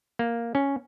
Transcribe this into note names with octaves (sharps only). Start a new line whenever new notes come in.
A#3
C#4